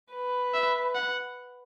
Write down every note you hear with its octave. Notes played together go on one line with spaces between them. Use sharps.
B4
E5
F#5